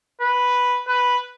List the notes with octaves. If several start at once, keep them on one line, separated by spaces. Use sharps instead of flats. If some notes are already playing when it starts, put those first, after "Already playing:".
B4
B4